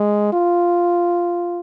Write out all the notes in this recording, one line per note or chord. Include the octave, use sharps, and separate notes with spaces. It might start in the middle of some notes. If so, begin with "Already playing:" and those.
Already playing: G#3
F4